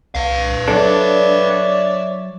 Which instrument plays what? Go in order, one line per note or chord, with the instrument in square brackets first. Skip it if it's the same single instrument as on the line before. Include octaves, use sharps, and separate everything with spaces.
[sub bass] C2 [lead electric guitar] B4 F5
[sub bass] F#3 [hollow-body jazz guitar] D4 A4 [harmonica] C#5 D5 E5